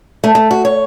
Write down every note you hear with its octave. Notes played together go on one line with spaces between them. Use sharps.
A3
A3
F#4
C#5